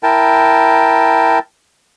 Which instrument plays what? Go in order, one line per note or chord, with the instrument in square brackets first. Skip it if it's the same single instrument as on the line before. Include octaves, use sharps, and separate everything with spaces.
[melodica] E4 A#4 G5 A5